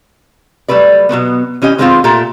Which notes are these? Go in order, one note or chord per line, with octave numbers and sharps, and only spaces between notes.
F#3 G3 A3 B4 D5
B2 F#3 A3 B3
E3 C#4 G4 D#5
D#3 G#3 B3 C4 D#4 F4
A#2 A3 G4 A4 A#5